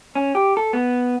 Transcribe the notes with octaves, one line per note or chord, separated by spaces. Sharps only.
C#4
G4
A4
B3